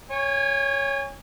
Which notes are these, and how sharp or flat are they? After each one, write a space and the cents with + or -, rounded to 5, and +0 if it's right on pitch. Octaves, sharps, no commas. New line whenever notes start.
C#5 +0 G#5 -35